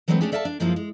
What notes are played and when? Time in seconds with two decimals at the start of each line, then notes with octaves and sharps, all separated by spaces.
0.08 E3 F#3 G#3 A3 C4 B4
0.21 A3 C#4 D4 G4 G#4
0.32 A4 D5 E5 F5 G5 A5
0.45 D4
0.60 F#2 F3 G#3 A#3 E4 F4
0.76 G#3